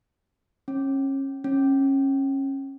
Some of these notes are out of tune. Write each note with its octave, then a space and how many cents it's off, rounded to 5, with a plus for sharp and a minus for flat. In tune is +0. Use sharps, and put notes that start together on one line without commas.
C#4 -30
C#4 -25